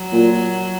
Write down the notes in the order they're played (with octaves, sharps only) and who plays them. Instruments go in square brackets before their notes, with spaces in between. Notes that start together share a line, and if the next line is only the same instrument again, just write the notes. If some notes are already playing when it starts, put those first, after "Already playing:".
Already playing: [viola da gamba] F#3
[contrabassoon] A#2